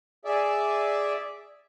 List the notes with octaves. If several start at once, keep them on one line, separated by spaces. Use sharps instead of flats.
G#4 D5 E5